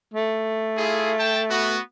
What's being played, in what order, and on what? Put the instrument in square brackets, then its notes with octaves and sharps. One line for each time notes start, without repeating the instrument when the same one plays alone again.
[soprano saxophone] A3
[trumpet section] E4 F4 G#4
G5 A5
B3 F#4